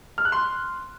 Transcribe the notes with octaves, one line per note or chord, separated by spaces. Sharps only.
F6
F#6
C6